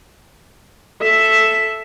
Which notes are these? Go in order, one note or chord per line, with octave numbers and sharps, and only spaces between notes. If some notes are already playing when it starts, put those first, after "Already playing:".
A4 E5